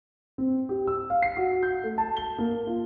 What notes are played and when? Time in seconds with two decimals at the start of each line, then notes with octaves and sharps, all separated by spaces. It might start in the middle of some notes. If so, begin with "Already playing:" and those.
0.38 C4
0.69 G4
0.87 E6
1.10 F5
1.22 C7
1.37 F#4
1.63 G6
1.84 A3
1.98 A5
2.17 G7
2.38 A#3
2.67 F4